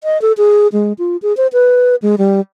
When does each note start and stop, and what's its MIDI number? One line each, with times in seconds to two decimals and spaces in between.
0.04 0.20 75
0.22 0.32 69
0.38 0.68 68
0.72 0.93 56
0.99 1.17 65
1.22 1.35 68
1.37 1.47 72
1.53 1.96 71
2.02 2.16 56
2.18 2.40 55